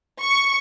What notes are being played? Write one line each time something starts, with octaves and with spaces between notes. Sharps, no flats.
C#6